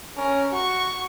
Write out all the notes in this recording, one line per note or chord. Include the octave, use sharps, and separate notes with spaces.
C#4 A#4
F#4 C#6